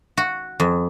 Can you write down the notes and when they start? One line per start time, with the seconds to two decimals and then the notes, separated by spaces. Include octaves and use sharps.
0.17 F#4
0.60 F2